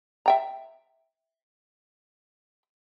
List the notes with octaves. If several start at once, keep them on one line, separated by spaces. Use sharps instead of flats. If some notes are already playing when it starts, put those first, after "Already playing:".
E5 G5 A#5